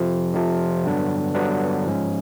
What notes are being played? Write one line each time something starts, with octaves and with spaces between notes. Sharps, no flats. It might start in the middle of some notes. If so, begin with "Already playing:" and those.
Already playing: F2 C3 F3
F2 C3 F3
G2 D3 F#3 B3 D4
G2 D3 F#3 B3 D4
G#2 F3 G#3 C#4